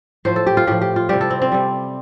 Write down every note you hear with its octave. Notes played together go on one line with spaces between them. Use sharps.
A2 F3 C5
A4
G4
F4
A2 F3 G4
G4
F4
C3 G3 G4
A4
C4
C4
C3 G3